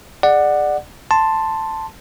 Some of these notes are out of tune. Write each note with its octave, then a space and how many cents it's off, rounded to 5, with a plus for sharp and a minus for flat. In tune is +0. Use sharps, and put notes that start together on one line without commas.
G#4 -10 D5 +20 F#5 +0
A5 +5 C6 +0